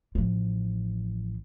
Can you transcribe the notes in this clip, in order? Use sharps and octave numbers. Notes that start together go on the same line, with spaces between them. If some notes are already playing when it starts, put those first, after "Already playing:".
A1 F3